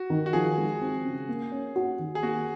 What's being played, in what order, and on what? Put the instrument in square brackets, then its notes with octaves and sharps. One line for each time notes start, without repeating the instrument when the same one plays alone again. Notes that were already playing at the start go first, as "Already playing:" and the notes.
Already playing: [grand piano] F#4
[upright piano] D#3
[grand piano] F#4
[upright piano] F3 [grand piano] G#4
[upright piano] G#3
C4
C#3
A#3
C#4
F#4
D#3
[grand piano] G#4
[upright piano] A#3 [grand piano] F#4